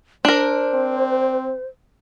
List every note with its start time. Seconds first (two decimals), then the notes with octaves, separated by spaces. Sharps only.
0.25 D4 A#4 C5
0.74 C4